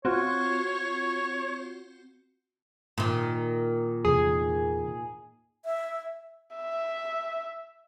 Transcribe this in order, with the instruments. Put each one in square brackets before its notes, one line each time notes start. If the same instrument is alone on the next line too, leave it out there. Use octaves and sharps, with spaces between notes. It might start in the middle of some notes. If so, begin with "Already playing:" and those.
[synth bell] C4 F4 F#4 [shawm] C#5
[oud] A#2 D#3
[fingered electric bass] E2 C3 [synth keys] G#4
[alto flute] E5
[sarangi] E5